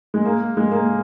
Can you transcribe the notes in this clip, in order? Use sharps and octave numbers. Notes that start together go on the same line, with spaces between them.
G#3
A#3
G#3
A#3